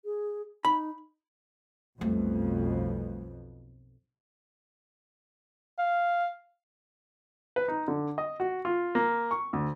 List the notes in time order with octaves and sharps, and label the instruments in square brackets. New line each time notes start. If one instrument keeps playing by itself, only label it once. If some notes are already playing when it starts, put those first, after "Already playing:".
[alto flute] G#4
[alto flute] D#4 [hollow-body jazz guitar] B5
[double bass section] B1 F2 B2 [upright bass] G3 A3
[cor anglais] F5
[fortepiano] B4
D#4
D3
D#5
F#4
F4
A#3
C#6
D2